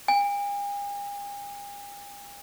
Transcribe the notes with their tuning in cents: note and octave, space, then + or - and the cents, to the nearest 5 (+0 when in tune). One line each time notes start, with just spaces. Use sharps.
G#5 -45